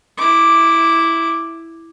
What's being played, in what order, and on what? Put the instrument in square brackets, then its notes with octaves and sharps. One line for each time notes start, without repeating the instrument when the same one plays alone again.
[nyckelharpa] E4 D6